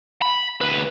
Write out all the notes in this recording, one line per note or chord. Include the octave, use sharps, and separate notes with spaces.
B5
D2 B4